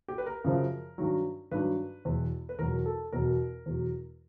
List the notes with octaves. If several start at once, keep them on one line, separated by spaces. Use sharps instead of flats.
G4
B4
A#4
F#2 C#3 F3
G2 D#3 F#3
G2 D#3 F#3 B4
E2 B2 F#3
B4
E2 B2 F#3 A#4
A4
E2 B2 F#3 A#4
E2 B2 F#3